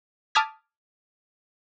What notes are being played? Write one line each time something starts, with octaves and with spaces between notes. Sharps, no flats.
A5 D6 D#6 F6 G#6 B6